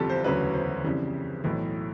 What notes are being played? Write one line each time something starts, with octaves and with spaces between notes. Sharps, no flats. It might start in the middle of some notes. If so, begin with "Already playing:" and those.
Already playing: G1 F2 C3 E3 G3 F4 G4 A4
C5
E1 D2 C#3 F#3 B4
C5
F2 C#3 E3 G3
B1 A2 E3